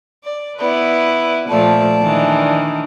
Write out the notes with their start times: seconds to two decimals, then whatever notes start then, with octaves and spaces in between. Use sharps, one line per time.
0.24 D5
0.59 B3 E4 B4 D5
1.48 A#2 F3 A3 D5 A5
2.01 D#3 E3 D4